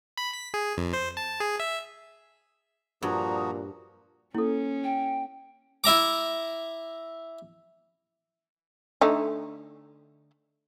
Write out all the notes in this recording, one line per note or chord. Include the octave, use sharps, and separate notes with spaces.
B5
B6
G#4
F2
C5
A5
G#4
E5
G2 A#2 F3 F#4 A#5 D#6
A#3 C#4 E4 A4
G5
E4 E5 A#5 D6
D3 A3 D#4